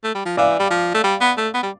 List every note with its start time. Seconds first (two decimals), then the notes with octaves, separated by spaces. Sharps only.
0.04 A3
0.15 G3
0.26 F3
0.37 E3 D5 F5
0.60 G3
0.71 F3
0.95 A3
1.04 G3
1.21 B3
1.37 A3
1.54 B3
1.63 G3